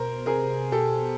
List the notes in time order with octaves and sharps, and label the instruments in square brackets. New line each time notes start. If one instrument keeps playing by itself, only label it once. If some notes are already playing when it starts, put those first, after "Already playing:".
Already playing: [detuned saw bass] B2 [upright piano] A#4 C5
[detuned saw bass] C3 [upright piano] G#4 A#4
[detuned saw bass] B2 [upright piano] G4 A4